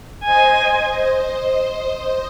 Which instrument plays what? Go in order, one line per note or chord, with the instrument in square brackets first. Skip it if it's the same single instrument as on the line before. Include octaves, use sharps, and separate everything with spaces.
[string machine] C5 D#5 [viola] G#5